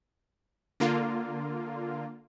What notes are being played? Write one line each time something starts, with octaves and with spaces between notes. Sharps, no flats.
D3 A#3 F4